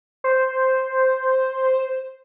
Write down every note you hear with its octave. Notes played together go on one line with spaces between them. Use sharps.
C5